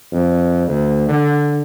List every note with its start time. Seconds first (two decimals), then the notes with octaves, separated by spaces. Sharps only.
0.12 F2
0.67 D2
1.09 D3